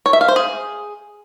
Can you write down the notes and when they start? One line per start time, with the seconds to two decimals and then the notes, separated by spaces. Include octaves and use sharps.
0.06 C#5
0.13 E5
0.21 F5
0.28 C5
0.36 G#4